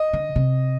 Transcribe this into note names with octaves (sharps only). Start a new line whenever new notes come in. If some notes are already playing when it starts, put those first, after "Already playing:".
Already playing: D#5
D3
C3